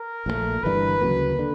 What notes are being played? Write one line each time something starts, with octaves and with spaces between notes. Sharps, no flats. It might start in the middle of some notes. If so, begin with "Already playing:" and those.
Already playing: A#4
A#1 A#2 F3 A3
G1 G2 E3 G3 B4
D2 C#3 F#3 A#3
D3